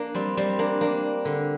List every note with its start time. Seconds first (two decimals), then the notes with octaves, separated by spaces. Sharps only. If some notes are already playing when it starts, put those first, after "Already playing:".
Already playing: A#3 D4
0.15 G3 C4
0.37 G3 C4
0.59 A#3 D4
0.81 A#3 D4
1.25 D3